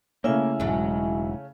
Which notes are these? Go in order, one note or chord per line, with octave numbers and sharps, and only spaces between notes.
C#3 A3 A#3 C#4 E4 E5 G#5
E1 G#2 F#3